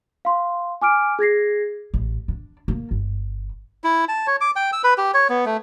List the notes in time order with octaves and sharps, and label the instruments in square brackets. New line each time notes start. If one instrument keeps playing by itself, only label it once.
[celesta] F5 C6
G#5 D6 F6 D7
G#4 G#6 A#6 C7
[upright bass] A1
D4
A#3
G1
[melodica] E4
A5
C#5
D6
G5
E6
B4
G4
C#5
B3
A3